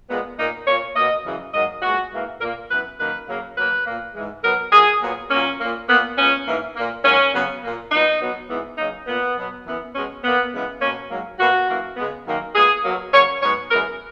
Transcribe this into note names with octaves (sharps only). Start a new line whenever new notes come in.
A#2 G#3 B3
A#2 A#3 D#4
A#2 A#3 C#5
B2 A#3 D#5
F#2 C#3 E3
G#2 F#3 A#3 D#5
A#2 G#3 B3 F#4
G#2 E3 A#3
A#2 A#3 A#4
F#2 E3 B3 B4
F#2 D#3 A#3 B4
C#3 F#3 A#3
B2 F#3 A#3 B4
A#2 A#3
G#2 E3 G#3
B2 F#3 B3 A#4
A#2 F#3 A#3 G#4
A#2 F#3 B3
A#2 F#3 A#3 C#4
A#2 A#3
A#2 A#3 B3
A#2 G#3 B3 C#4
G#2 E3 A#3
A#2 A#3
G#2 F#3 A#3 C#4
C#3 F#3 B3
A#2 A#3
A#2 F#3 B3 D#4
B2 F#3 B3
G#2 E3 B3
F#2 C#3 F#3 A#3 D#4
A#2 A#3 B3
B2 F#3 B3
F#2 E3 B3
B2 G#3 B3 C#4
A#2 A#3 B3
F#2 C#3 E3 G#3 B3
B2 A#3 C#4
G#2 F#3 A#3
B2 A#3 F#4
F#2 E3 A#3
C#3 G#3 B3
F#2 D#3 A#3
A#2 G#3 B3 G#4
B2 F#3 A#3
C#3 F#3 A#3 C#5
G#2 F#3 B3 C#5
F#2 E3 G#3 B3 A#4